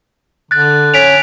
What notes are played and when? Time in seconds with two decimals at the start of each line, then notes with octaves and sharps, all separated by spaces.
0.51 D3 F#6 A6
0.94 C#4 B6 D7 F7